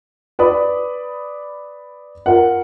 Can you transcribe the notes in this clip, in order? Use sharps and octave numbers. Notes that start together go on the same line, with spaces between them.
B4 D5 B5 D#6
F4 A#4 F#5